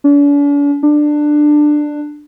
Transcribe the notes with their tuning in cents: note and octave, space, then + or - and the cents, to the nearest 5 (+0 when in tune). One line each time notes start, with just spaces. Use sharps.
D4 -45
D4 +15